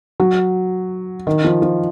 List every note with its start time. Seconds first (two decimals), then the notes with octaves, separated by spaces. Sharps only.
0.20 F#3
1.27 D#3
1.45 F3
1.62 F3